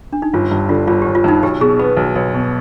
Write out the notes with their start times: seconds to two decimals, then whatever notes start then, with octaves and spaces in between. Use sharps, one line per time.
0.13 D4
0.22 D#4
0.34 G1 F4
0.51 G2
0.69 D3 F4
0.87 G1 F4
1.02 G4
1.06 G1
1.15 F4
1.24 G2 D#4
1.43 B1 G4
1.61 B2 G#4
1.79 B3 B4
1.97 B1
2.16 B1
2.34 B2